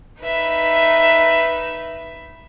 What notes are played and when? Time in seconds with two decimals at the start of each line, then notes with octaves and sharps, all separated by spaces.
0.21 D#4 B4 E5